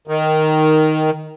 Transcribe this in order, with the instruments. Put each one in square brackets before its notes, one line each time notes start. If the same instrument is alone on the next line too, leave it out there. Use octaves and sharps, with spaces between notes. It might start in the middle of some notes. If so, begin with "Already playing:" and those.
[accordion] D#3